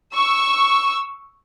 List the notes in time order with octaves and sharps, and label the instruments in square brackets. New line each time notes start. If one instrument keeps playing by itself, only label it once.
[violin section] C#6 E6